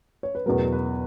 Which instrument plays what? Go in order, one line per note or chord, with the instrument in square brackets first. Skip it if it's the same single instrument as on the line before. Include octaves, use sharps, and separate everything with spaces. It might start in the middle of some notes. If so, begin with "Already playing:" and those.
[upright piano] C#5
B4
E2 B2 F#3 A#4
B4